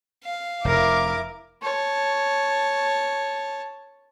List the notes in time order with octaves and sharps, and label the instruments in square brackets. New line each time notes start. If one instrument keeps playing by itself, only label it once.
[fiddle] F5
[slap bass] F1 [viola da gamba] E4 A#4 [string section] D6
[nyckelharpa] C#5 A5